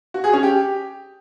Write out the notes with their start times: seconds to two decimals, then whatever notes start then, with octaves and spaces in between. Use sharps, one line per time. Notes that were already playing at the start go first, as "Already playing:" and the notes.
0.14 F#4
0.24 G#4
0.33 C#4
0.43 G4